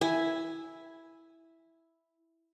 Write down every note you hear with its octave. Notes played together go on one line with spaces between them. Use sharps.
E4 G#5